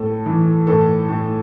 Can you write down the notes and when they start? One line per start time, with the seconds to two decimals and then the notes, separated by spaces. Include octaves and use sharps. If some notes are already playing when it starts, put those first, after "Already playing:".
Already playing: A2 A4
0.26 E3
0.67 A2 A4
1.09 A2